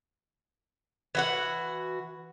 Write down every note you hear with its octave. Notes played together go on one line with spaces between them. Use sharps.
E3 F#4 F#5